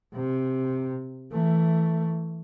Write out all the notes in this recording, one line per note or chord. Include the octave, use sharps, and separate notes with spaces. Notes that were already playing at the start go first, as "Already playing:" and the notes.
C3
E3 A3